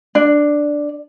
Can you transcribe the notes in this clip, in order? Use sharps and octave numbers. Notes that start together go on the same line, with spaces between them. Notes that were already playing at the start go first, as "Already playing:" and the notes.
D4